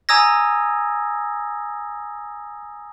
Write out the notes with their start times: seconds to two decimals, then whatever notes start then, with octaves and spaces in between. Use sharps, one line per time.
0.09 G#5 A#5 D#6 E6 G#6 A#6